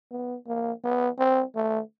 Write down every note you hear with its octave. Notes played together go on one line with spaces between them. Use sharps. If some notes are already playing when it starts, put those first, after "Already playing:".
B3
A#3
B3
C4
A3